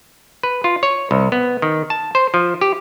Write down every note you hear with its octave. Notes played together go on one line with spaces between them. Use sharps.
B4
F4
C#5
C2
B3
D#3
A5
C5
F3
G4